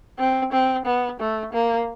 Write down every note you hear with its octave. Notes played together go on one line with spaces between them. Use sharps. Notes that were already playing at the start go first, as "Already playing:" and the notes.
C4
C4
B3
A3
A#3